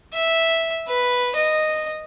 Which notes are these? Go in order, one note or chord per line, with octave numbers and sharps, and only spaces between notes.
E5
B4
D#5